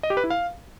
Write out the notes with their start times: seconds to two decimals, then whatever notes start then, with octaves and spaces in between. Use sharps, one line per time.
0.03 D#5
0.10 G4
0.17 B4
0.24 E4
0.30 F5